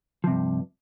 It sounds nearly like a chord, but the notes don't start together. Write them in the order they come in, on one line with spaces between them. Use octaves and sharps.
F3 C3 G2